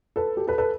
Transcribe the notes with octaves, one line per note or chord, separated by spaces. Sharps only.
A4 B4
G4 A4
A4 B4
A4 B4